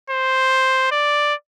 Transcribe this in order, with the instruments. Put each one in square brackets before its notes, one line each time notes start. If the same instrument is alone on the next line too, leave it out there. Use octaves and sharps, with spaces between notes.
[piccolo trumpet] C5
D5